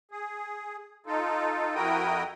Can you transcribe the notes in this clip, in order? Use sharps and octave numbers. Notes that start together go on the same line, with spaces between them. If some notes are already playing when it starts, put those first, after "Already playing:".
G#4
D#4 F4 A4
F2 E4 F#4 A#4 G5 D#6